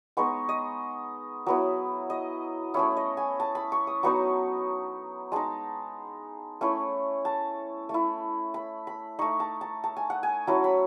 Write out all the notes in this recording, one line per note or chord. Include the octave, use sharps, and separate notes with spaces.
G#3 B3 D#4 C#6
D#5
F#3 B3 E4
D#5
A3 C#4 E4 C#5
D#5
G#5
A5
B5
C#6
D#6
F#3 B3 D#4 C#6
G#3 D#4 A5
A3 C#4 E4
A5
A3 E4
B5
B5
A3 D#4 C#6
A5
A5
A5
G#5
F#5
G#5
F#3 C#4 E4 A5
B5